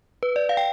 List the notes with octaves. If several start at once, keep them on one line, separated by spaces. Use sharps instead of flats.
B4
D5
F5
G5